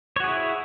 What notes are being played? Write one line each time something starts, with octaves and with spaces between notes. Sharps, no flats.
E4 F#4 G#4 C#5